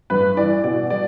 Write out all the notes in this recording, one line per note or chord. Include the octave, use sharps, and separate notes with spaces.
G2 B4
E3 D5
B2 D5
G3 D5